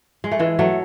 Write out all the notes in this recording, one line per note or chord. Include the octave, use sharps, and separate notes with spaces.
G#3
A3
E3 G#3
F#3 A3